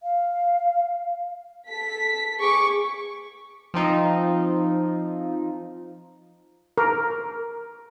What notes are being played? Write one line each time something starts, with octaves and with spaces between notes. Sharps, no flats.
F5
A4 B6
G#4 C#6 D6
F3 C4 D#4 F4
A#4